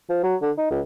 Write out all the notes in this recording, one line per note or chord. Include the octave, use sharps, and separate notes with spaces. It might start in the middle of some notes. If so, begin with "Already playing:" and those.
F3
F#3
D3
D#4
C#2